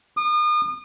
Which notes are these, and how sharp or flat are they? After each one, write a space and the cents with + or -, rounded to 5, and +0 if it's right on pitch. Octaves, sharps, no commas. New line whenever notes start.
D#6 -40